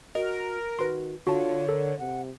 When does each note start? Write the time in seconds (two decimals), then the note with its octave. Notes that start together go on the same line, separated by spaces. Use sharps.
0.15 F#4 A#4 D#5
0.79 D#3 F#4 B4 C6
1.27 D3 F4 F#4 C#5 A5
1.69 A4 A#4
1.99 C3 F#5